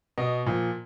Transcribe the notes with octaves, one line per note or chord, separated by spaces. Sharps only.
B2 D#5
A#2 F3